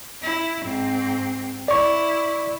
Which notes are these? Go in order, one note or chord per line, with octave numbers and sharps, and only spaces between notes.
E4
G#2 C4
E4 D5 C#6